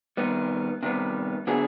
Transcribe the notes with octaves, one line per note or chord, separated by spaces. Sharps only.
C3 D#3 G3 B3
C3 D#3 G3 B3
D3 F#3 B3 E4 G#4